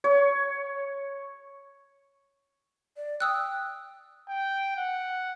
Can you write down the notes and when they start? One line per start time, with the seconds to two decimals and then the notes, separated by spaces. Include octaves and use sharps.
0.04 C#5
2.97 D5
3.20 G5 D#6 E6 F#6
4.29 G5
4.76 F#5